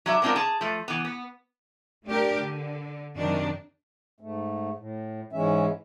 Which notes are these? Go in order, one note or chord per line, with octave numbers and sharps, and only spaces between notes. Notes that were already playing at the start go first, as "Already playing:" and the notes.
F#3 D4 E5
G#3 B3 C4 D4 F4 A#4
G#4 A5
F3 A3
E3 B3
B3
A3 D4 G4 A#4
D3
F#2 C3 D#3 D4
G#2 A3
A2
G#2 E3 G#3 C#4 E5